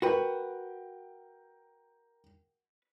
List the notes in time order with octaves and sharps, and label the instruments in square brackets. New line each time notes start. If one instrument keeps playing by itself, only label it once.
[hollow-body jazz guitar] F#4 B4 [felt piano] A#4 G5